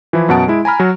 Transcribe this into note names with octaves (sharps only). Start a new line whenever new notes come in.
E3 F3 E4
F#2 B2 F#5 A5 D7
G#3 E4
G#5 A#5 B5 F6
F#3 F#4